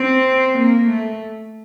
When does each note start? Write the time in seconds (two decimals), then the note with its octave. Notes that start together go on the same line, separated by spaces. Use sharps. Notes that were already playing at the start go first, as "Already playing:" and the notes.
Already playing: C4
0.57 A#3
0.89 A3